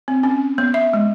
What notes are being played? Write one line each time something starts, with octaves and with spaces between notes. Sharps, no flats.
C4
C#4
B3
E5
G#3